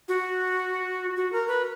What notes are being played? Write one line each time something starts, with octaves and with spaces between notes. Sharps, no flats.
F#4
F#4
A#4
B4